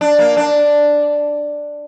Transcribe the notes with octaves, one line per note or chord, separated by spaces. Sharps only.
D4
A#3
D4